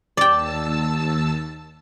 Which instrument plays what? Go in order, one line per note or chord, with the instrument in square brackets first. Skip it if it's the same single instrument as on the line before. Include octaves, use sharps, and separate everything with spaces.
[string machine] D#2 A5 E6 [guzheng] D5 G5